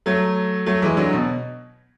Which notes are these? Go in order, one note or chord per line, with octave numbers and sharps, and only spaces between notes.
F#3 A3
F#3 A3
E3 G#3
D3 F#3
B2